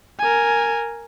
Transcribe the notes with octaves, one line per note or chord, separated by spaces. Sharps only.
A#4 G#5